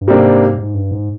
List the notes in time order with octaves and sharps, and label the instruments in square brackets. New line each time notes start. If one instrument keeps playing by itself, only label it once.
[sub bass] G2
[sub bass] G#2 [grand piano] C3 G3 A#3 D4
[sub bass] G#2
G2
G#2